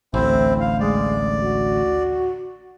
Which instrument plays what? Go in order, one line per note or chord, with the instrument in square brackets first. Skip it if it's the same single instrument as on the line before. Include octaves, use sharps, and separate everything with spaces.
[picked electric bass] A1 D2 [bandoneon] C4 E4 C5
[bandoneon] F5
[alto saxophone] G#3 [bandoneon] D5
[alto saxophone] F#4